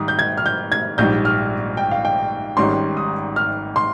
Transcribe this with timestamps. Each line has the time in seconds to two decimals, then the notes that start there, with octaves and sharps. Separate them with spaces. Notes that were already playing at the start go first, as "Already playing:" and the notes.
Already playing: G#2 D#3 G3 D#6
0.08 G6
0.19 G#6
0.37 F6
0.46 G6
0.72 G#6
0.98 A#1 G#2 G3 G6
1.25 F6
1.77 G5
1.91 F5
2.05 G5
2.57 G#1 G#2 D#3 G3 C#4 C6
2.97 D#6
3.36 F6
3.76 C6